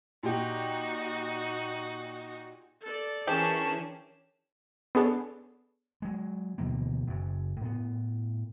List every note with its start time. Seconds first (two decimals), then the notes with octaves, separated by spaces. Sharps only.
0.23 A#2 D#4 F#4 G4
2.81 A4 D5
3.27 E3 C#4 D4 G4 G#4 A#4 A5
4.95 B3 D4 G#4 A4 C#5 D5
6.02 F#3 G#3
6.58 D2 B2 E3 A#3
7.07 F#1 F#2
7.61 A2 B3